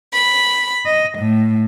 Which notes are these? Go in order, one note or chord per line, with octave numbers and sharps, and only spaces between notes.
B5
D#5
A2